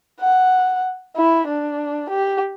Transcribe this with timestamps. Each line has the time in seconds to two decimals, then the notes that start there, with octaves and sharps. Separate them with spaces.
0.20 F#5
1.16 E4
1.48 D4
2.09 G4